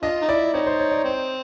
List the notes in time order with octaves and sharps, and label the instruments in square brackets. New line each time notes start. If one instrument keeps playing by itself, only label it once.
[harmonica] D4 F4 [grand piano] D#5
[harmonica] D#4
[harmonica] E4 [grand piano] D5
[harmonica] C4 D#4 [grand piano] C#5
[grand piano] C5
C#5
D5
[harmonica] C4